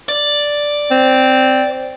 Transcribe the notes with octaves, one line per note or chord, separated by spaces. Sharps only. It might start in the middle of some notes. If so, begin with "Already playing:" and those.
D5
C4